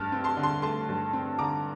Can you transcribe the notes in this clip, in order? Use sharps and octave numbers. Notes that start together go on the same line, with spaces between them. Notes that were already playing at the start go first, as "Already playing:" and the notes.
Already playing: G2 A3 F6 A6
C4
A5 C6
D3
A5 C6
A3 A5 C6
G2
C4
D3 A#5 D6